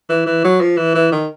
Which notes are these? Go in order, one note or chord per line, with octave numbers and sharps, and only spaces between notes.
E3
E3
F#3
F3
E3
E3
D#3